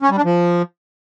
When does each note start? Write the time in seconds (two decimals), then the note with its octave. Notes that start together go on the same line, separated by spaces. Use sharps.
0.02 C#4
0.10 G3
0.17 D4
0.25 F3